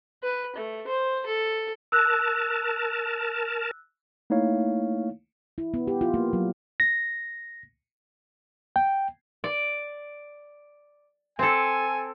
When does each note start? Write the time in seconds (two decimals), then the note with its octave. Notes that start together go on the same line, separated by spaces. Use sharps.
0.23 B4
0.56 A3
0.88 C5
1.26 A4
1.92 A#4 A5 E6 F#6
4.30 A3 A#3 D#4 E4 C#5 F5
5.58 E4
5.74 B3
5.87 G4
6.01 F4
6.14 A#3
6.33 F#3
6.80 A#6
8.76 G5
9.44 D5
11.39 C4 A4 G#5